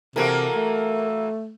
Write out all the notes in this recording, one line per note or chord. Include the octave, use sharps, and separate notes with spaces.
C3 E3 A#3 F#4 A4 A#4
A3